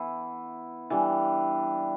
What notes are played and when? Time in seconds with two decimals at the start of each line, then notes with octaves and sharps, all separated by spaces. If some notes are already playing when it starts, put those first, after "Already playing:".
Already playing: E3 B3 E4
0.90 E3 G3 D4